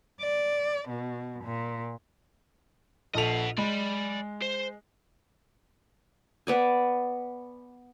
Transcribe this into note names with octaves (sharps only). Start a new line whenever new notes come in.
D5
B2
A#2
A#1 A4 D#5 F#5 F7
G#3 D5 B5
C5
B3 D5 G#5